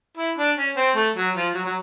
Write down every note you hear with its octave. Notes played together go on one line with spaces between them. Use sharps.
E4
D4
C#4
C4
A3
F#3
F3
F#3
F#3